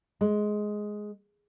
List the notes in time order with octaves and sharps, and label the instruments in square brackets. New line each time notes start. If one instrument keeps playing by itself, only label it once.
[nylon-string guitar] G#3